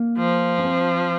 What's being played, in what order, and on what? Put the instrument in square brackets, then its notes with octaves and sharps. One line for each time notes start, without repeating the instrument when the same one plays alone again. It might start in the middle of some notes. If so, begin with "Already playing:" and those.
Already playing: [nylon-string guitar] A#3
[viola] F3
[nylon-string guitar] C#4
C4